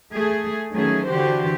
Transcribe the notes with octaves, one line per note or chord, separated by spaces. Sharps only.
A3 G#4
D#3 F#3 A3 C#4 G#4
D3 E3 F#4 G4 C5